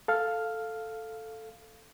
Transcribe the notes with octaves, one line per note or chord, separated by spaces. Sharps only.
A4 F5 F6